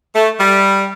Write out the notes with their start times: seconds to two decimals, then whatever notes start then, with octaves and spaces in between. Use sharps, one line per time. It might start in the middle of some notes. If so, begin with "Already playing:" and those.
0.15 A3
0.39 G3